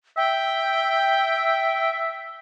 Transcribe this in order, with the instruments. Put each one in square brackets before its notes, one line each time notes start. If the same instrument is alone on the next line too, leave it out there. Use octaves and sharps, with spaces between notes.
[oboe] E5 [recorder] G5